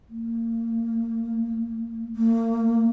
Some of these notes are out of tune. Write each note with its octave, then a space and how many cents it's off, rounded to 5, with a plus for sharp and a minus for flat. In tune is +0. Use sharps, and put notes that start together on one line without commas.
A#3 -30
A#3 -35